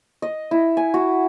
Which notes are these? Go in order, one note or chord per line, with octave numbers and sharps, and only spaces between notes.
D#5
E4
G#5
F#4